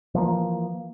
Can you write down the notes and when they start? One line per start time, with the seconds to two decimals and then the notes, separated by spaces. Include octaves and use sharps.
0.15 E3 F3 A#3